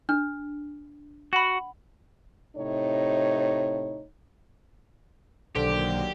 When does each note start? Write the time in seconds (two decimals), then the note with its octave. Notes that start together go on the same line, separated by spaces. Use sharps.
0.09 D4 F6
1.33 F#4 F#5 B5
2.56 A2 C3 D#4 C#5
5.55 B1 D3 D#3 F#3 A#3 G4 C5 D6